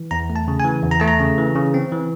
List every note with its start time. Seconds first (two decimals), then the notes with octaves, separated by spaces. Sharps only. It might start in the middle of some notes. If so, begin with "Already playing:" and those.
Already playing: E3
0.11 E2 A#5
0.30 A3
0.36 A5
0.48 C#3
0.60 G#5
0.65 E3
0.83 E2
0.91 A#5
1.00 A3 A5
1.08 A#5
1.20 C#3
1.38 E3
1.55 C#3
1.74 C4
1.92 E3